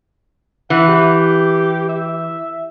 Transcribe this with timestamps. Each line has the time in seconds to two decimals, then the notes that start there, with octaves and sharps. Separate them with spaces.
0.70 E3 F#5
0.88 G4
1.89 E5